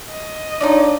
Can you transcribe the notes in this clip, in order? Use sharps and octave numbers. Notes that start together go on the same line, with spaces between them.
D#5
D4 D#4 F4 C#5 D5